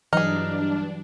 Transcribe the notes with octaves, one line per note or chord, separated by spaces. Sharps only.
G2 E3 F#3 D4 D#4 G#4 F6